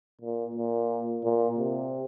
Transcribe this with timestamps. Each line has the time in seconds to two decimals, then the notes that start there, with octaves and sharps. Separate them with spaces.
0.21 A#2
0.55 A#2
1.24 A#2
1.58 C3